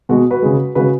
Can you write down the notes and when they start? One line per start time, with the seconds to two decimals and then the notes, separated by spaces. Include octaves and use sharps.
0.09 B2 G#3 F#4
0.30 F#4 B4
0.42 C#3 G#3
0.75 C#3 G#3 F#4 B4